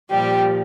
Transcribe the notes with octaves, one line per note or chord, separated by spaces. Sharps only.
A#2 F3 G3 G4